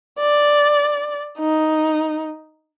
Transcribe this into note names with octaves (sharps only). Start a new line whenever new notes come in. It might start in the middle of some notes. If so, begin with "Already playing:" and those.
D5
D#4